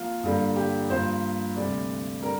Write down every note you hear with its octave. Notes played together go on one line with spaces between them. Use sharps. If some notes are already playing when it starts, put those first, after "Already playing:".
Already playing: F3 A#3 F4
G2 D3 G3 A#3
G4
G2 F3 A#3 C5
D2 C3 G3 D5
D3 G3 A#4